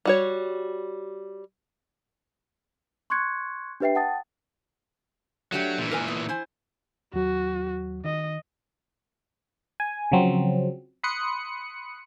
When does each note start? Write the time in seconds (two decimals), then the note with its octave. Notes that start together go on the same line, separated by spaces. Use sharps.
0.05 G3 F#4 C#5
3.10 C6 C#6 F#6 G#6 C#7
3.80 D4 G4 B4 E5 G5 C7
3.95 F#5 G5 A5 D#6 A6
5.52 F#3 A3 D4 G4
5.78 A#2 E3
5.91 A#4 B4 G#5
6.08 B3
6.29 E4 C5 G#5
7.14 D#2 F#3 F#4
8.05 D#3 D#5
9.80 G#5
10.12 C#3 F3 F#3 C4
11.03 B5 C6 D#6 F#6 C#7